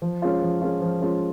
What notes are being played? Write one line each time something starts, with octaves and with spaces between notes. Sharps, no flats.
F3
G#3 C#4 F4
F3
G#3 C#4 F4
F3
G#3 C#4 F4